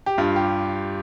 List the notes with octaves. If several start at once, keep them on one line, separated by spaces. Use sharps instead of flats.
G4
G2 F4
G4